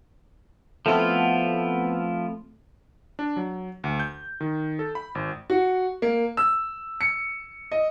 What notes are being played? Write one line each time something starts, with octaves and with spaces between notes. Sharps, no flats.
F3 A3 B3 C4 E4 F4 A4
D4
F#3
D2
G6
D#3
A4
B5
G#1
F#4
A#3
E6
C#7
D#5